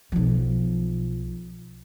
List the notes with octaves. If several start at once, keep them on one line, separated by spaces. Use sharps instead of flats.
B1 F3